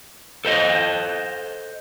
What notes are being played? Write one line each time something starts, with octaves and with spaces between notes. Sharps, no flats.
A4 C5 D#5